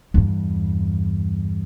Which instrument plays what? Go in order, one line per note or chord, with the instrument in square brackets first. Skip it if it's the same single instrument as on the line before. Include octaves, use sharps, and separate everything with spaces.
[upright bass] E2 G2